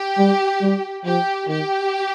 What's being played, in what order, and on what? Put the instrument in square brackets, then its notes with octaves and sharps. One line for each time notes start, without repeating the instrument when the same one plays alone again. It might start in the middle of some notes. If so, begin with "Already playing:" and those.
Already playing: [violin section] G4
[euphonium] G3
G3
[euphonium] F3 [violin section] G4
[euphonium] D#3 [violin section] G4